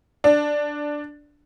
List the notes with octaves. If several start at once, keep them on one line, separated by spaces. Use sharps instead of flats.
D4